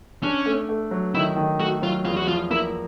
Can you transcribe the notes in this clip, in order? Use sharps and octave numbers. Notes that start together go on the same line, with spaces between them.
C#4 D4
A3
A3
F#3
D#3 E4
D#3
A3 F#4
F#3 F4
E2 F4
F#4
F3 F4
A#3 E4